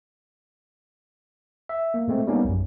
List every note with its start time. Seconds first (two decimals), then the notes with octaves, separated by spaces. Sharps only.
1.69 E5
1.94 A#3
2.08 A#2 G#3 A3 C4
2.27 G3 G#3 A#3 B3 C#4 D#4
2.45 A#1 F#2